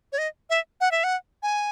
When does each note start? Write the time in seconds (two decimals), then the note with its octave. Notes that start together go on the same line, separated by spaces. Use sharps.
0.12 C#5
0.18 D#5
0.50 E5
0.81 F#5
0.91 E5
1.04 F#5
1.43 G#5